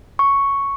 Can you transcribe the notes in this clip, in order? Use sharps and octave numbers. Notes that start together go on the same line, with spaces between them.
C#6